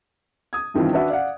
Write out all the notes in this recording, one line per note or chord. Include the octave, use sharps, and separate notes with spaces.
D#6 G#6
G2 D#3 E3 C4 F4
D4 F#4 B4 E5 F#5
D5 F5 F#5